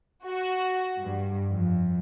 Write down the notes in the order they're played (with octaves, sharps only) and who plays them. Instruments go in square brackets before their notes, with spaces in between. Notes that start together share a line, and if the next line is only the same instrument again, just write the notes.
[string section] F#4
G2
F2